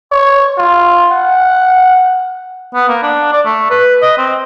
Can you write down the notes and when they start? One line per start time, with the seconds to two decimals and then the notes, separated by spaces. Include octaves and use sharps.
0.11 C#5
0.58 F4
1.12 F#5
2.74 B3
2.88 A#3
3.03 D4
3.33 D5
3.45 A3
3.70 B4
4.02 D#5
4.18 C4